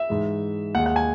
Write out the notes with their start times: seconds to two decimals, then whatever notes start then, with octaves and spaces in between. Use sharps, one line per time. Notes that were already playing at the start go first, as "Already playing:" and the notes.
Already playing: E5
0.10 G#2 E3 G#3
0.75 D#2 D#3 G#3 F#5
0.86 F#5
0.96 G#5